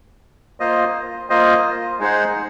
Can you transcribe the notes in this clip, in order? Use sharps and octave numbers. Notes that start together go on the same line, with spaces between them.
A#3 F4 C5 D#5
A#3 F4 C5 D#5
G#3 D#4 G#4 C5 F#5